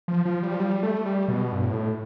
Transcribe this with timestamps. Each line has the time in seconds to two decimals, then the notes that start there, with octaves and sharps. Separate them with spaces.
0.08 F3
0.25 F3
0.43 G3
0.54 F3
0.60 G3
0.83 A3
1.06 G3
1.28 B2
1.52 G2
1.63 A2